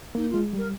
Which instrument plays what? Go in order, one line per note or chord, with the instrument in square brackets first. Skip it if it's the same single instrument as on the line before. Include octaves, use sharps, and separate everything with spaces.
[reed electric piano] A#3 [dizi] D#4
[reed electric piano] G#3 [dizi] F4
[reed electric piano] G3 [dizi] A#4